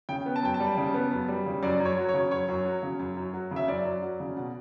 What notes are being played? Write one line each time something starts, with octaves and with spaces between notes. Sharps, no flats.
C#3 G5
B3
A5
F#2 G5
A5
G3
C#3
B3
F#2
G3
C#3
F#2 D5
F#2
C#5
F#3
C#5
C#3
F#2 C#5
F#2
F#3
C#3
F#2
F#2
F#3
C#3
E5
F#2 D5
F#2
F#3
C#3
B2